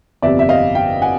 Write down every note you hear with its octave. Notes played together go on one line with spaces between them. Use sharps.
G1 F2 C3 D5 E5
E5
D#5 F5
F5 G5
F#5 G#5